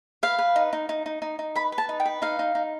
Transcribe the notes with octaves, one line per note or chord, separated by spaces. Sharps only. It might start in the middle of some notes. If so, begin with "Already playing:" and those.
B4 F5
B4
D#4
D#4
D#4
D#4
D#4
D#4
B4 B5
B4
A5
D#4
G5
B4
D#4 F5
D#4
D#4